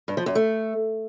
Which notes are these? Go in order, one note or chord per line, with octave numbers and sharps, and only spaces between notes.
G2
F3
F#2
A3